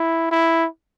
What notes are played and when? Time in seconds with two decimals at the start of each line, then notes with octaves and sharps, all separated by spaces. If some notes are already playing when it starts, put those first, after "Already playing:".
Already playing: E4
0.32 E4